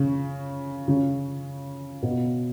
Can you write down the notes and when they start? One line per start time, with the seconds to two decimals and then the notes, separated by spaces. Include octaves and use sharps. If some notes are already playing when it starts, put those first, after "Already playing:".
Already playing: C#3
0.88 C#3
2.02 B2